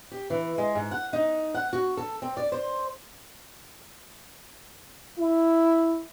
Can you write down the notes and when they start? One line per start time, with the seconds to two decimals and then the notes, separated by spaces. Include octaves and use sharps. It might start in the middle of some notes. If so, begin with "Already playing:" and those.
0.12 G4
0.30 E3
0.58 G#3
0.75 G#2
0.91 F#5
1.13 D#4
1.54 F#5
1.73 F#4
1.97 A4
2.22 C4
2.37 D5
2.52 C5
5.18 E4